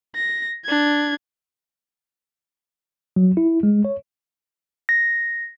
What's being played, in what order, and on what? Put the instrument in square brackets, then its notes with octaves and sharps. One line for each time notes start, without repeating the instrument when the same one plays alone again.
[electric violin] A#6
D4 G#6
[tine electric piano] F#3
E4
G#3
C#5
[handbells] A#6